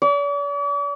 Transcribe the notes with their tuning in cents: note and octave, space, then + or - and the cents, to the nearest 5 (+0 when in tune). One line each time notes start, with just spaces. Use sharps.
D5 -45